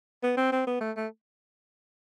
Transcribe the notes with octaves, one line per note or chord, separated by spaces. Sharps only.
B3
C4
C4
B3
A3
A3